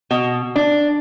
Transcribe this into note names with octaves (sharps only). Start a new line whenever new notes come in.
B2
D4